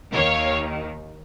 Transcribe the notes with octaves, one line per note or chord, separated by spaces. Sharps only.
D#2 D#3 C#5 F5